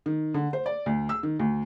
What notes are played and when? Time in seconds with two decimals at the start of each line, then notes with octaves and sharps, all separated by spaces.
0.06 D#3
0.34 D3
0.53 C5
0.66 D5
0.86 D2
1.09 E6
1.23 D#3
1.39 D2